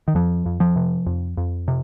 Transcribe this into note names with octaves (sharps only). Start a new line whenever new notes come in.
D#3
F2 F3
F2
F3
C3
F2
F2
C3